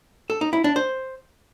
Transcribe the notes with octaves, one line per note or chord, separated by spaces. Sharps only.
A4
D#4
E4
D4
C5